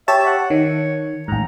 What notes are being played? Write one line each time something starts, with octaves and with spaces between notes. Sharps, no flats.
G4 C#5 E5 A5
F#5
D#3 C#5
A1 G#2 A#5